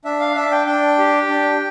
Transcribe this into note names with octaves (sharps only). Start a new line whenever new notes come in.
D4 E5
F5
D4 E5
G5
D4 G5
G4
D4